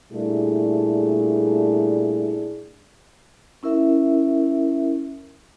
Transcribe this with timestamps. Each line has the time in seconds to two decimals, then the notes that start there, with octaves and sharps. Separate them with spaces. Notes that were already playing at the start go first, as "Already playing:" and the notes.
0.12 A#2 G3 A3 D4 E4 G#4
3.63 C#4 E4 A#4 E5